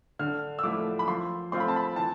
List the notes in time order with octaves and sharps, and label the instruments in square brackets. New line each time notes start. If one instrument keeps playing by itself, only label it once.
[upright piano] D3 F6
E6
F3 A3 E4 D6
B5
F3 C6
A3 C4 F4 C6
B5
A5
B5
E3 A5